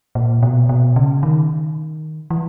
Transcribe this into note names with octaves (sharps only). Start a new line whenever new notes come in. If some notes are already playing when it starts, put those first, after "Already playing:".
A#2
B2
B2
C#3
D#3
E3